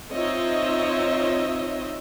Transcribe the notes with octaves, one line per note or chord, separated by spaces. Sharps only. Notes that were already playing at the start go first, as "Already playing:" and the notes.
C4 D#4 F4 C#5 D#5 E5